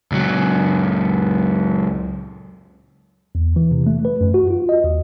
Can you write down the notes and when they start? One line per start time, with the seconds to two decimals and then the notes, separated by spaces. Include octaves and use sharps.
0.12 C#2 F#3
3.35 E2
3.56 E3
3.72 C3
3.87 A3
4.05 B4
4.21 F#2
4.34 F#4
4.50 F4
4.69 D#5
4.84 D#2